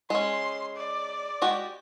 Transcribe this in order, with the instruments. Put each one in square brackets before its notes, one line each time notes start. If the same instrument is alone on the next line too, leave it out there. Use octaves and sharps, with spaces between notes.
[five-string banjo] G#3 C#4 [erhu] C6
[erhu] D5
[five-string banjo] G#3 F#4 G4